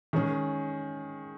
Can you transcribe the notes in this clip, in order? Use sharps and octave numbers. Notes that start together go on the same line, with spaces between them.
D#3 G#3 C#4 G#4